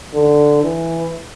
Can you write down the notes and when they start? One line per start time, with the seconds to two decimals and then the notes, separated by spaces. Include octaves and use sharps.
0.14 D3
0.63 E3